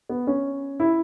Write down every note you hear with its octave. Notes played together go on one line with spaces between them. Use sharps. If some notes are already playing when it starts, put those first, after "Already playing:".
B3
C#4
E4